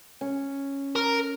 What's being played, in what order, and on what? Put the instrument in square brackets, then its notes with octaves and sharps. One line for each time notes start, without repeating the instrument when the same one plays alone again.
[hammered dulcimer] C#4
[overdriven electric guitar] A#4